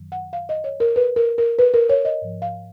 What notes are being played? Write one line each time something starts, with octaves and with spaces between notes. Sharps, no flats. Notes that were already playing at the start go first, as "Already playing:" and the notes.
Already playing: F#2 D#3 F#3
F#5
F5
D#5
C#5
A#4
B4
A#4
A#4
B4
A#4
C#5
D#5
G#2 F3
F5